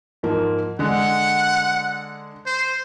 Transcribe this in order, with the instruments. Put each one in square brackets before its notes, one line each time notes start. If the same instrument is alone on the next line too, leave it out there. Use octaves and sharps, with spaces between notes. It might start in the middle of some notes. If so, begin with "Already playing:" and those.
[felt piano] G#2 F3 A#3
[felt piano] D3 G#3 [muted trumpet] F#5
[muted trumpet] C5